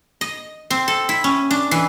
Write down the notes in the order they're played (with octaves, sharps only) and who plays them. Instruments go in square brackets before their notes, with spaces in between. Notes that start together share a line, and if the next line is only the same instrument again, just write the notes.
[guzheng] D#5
C4
A4
E4
C#4
D4
E3